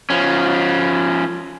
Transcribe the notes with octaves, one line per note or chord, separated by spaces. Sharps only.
F3 C#4